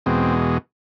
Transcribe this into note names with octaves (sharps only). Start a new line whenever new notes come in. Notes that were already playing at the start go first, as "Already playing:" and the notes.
E2 B2 G#3 C4